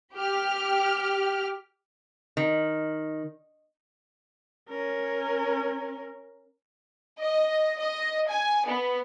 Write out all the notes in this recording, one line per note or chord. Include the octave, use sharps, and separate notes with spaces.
G4 F6
D#3
C#4 A#4
D#5
D#5
G#5
B3